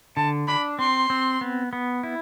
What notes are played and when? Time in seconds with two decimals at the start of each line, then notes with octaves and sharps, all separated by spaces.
0.16 D3 A5
0.48 D4 B5
0.79 C4 C6
1.10 C4
1.41 B3
1.73 B3
2.03 E4